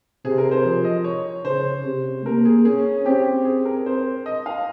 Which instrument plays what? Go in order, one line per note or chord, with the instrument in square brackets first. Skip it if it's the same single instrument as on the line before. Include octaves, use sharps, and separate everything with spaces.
[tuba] C3 [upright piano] G#4
[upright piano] A#4
C5
[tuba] F3
[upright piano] D#5
C#5
[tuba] C#3 [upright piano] C5
[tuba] C3
[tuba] A#3 [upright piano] A#4
[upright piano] G#4
[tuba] C#4 [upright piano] G#4
[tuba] C4 [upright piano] G4
[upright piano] G#4
A#4
C5
D#5
F5